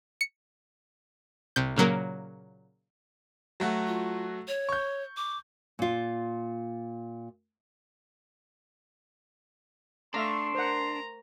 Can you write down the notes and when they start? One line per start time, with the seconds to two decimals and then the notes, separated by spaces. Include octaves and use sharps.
0.21 C#7
1.56 C2 C3 G6
1.76 A#2 C#3 F#3 A#3
3.60 F#3 A3 F#4
3.87 F4
4.48 C#5
4.69 C#6 G6
5.17 D6
5.79 A#2 F4
10.14 A3 D4 E5 F5 A#5 C6 C#6
10.55 A#4 C5 F#5 A#5